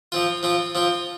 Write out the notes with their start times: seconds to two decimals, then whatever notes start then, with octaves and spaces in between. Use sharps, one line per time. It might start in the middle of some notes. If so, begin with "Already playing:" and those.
0.12 F3 C4 F4
0.43 F3 C4 F4
0.75 F3 C4 F4